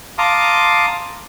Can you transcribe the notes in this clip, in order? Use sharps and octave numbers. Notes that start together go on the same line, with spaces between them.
F5 A5 A#5 C6 D6 D#6